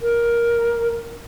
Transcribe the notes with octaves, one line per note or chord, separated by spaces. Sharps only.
A#4